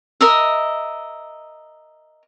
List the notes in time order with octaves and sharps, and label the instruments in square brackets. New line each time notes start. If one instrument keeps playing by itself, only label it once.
[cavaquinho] A#4 D#5 E5